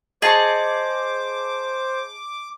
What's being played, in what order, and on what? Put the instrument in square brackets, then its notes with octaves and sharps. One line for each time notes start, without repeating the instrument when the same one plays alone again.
[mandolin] G#4 A5 [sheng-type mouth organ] C5 [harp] D#5 C#6 [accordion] D6